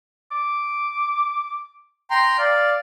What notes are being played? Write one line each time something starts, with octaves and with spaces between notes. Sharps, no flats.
D6
G5 A#5 C6
D5 F5